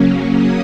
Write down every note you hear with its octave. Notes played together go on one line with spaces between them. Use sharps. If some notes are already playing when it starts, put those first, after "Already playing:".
Already playing: C#3 F#3 A#3 C#4
D#6